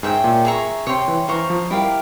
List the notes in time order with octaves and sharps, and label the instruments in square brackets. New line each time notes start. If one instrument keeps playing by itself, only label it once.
[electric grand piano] G#2 [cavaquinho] G#4 C#5 E5 G5
[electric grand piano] A#2
[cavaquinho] G#4 E5 A#5 C#6
[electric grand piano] C3 [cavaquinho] C#5 G5 C6
[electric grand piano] E3
[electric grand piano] E3 [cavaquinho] C5 F5 A#5 C#6
[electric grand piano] F3
[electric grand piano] G3 [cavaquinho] E4 G4 A#4 F5